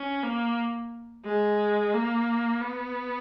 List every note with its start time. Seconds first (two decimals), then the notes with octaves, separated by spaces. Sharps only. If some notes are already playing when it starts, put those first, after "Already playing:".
Already playing: C#4
0.23 A#3
1.25 G#3
1.93 A#3
2.61 B3